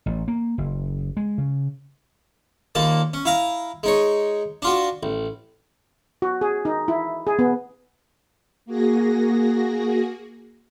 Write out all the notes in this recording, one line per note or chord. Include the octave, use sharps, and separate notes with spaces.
A1
A#3
F#1
G#3
C#3
D#2 A#2 A#3 A5
C#4
E4 F5 A#5
G#3 D#4 C#5
D4 F4 F#4
A1
F#4
G#4
D#4
E4
G#4
B3
A#3 F#4 G#4 A#6